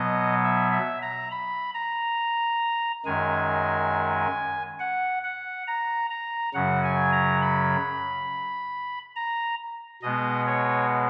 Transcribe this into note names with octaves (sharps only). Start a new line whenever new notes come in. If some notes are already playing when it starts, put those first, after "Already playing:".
Already playing: B2 F#3 B3 D#5
E5
E5
A#5
B5
A#5
F#2 D#3 G#3 G#5
F#5
F#5
A#5
A#5
F#2 C#3 F#3 F#5
G#5
A#5
B5
A#5
B2 G#3 B3 D#5
C#5